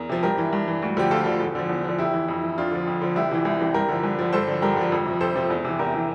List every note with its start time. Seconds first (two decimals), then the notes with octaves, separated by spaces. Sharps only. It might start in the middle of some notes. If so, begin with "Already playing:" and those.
Already playing: E2 A#4
0.09 C3 F3
0.23 G2 G4 A#4
0.38 E3
0.53 G2
0.68 E3
0.82 D2
0.97 D3 F3 G4
1.11 D2 F4 A4
1.26 D3 F3
1.41 E2
1.55 D3 F3
1.69 E2
1.84 D3 F3
1.98 F2 E4 G4
2.13 E3
2.28 F2
2.43 E3
2.58 F2 D4 F4
2.72 D3 F3
2.87 F2
3.01 D3 F3
3.15 C2 E4 G4
3.31 C3 E3
3.45 C2
3.60 C3 E3
3.74 G2 G4 A#4
3.89 D3 F3
4.04 G2
4.19 D3 F3
4.33 G2 A4 C5
4.48 D3 F3
4.62 G2 G4 A#4
4.77 D3 F3
4.92 F2
5.06 C3 F3
5.21 F2 A4 C5
5.35 C3 F3
5.50 E2
5.65 C3 E3
5.79 E2 G4 A#4
5.94 C3 E3